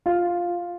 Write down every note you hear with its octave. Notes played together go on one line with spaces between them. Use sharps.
F4